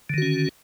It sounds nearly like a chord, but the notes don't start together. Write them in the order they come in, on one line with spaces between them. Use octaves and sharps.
D3 D#3 F#4 C#4